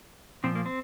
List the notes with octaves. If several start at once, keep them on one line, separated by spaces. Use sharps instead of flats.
A#2 F3 C4
A#3
C4